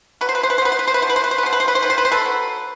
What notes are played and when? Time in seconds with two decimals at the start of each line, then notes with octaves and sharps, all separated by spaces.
0.21 F#3 B4
0.29 C5
0.35 B4
0.43 C5
0.50 B4
0.58 C5
0.62 B3 B4
0.72 C5
0.79 B4
0.88 C5
0.94 B4
1.02 B2 C5
1.10 B4
1.16 C5
1.24 B4
1.31 C5
1.38 B4
1.43 B2 C5
1.53 B4
1.60 C5
1.68 B4
1.75 C5
1.82 D#3 B4
1.90 C5
1.98 B4
2.05 C5
2.12 A4 B4
2.25 F#3